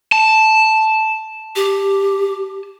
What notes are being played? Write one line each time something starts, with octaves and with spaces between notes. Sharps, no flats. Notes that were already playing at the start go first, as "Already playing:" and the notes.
A5
G4